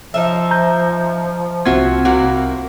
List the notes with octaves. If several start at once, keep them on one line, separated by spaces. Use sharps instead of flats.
F3 D#4 F4 E5
A#5 G6
C2 C4 F4 F#4 E5 G#6
C3 A#3 E4 F#4